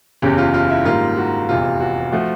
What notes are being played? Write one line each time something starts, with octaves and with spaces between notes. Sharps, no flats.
F#1 E2 C#3 G4
F4
F4
E4
G#2 D#3 G3 A#3 F4
F#4
F1 E2 C3 F4
F#4
F3 A3 F#4